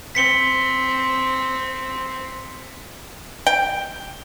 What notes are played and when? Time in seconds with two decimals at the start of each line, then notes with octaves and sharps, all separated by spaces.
0.15 C4 B6 C#7 G7
3.47 G5